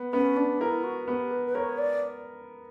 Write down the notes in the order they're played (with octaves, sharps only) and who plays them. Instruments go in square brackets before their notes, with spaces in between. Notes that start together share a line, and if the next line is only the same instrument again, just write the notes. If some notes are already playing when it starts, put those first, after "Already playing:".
Already playing: [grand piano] B3
[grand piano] B3 [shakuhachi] C#4
[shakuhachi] D4
[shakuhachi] E4 [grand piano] A#4
[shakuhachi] F#4
[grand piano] B3 [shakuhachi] G4
[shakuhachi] B4
B4
[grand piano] A#4 [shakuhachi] C#5
[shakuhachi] D5